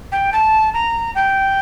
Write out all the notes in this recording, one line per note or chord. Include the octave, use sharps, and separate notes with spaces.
G5
A5
A#5
G5